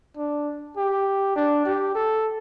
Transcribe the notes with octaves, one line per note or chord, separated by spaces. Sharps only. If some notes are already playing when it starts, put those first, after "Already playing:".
D4
G4
D4
G4
A4